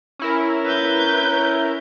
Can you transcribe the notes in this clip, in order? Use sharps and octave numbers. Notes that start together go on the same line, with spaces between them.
C#4 E4 A#4
B4 G6